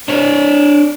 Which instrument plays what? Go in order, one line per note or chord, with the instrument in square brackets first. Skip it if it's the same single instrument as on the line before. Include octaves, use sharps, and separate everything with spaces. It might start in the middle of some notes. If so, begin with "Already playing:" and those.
[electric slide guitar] D4 C#5 D5